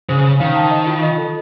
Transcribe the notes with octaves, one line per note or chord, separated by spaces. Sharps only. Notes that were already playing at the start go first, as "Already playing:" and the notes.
C#3 C5
C5
D#3 F5
A5
D#5
F4
D#5
A4